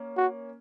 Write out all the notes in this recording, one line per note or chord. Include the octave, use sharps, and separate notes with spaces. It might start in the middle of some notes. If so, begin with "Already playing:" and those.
Already playing: A#3 C#4
F#4